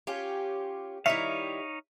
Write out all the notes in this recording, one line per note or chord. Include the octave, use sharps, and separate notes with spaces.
C#4 F4 G4
D#3 G3 D#4 E4 C#5 E5 F5